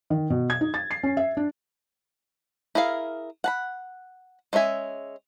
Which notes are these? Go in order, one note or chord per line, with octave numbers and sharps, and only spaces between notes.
D#3
B2
G#6
D#4
A6
C7
C#4
E5
D4
E4 G#4 A#4 F5
F#5 A5 B5
G#3 C#4 D4 E5 G#5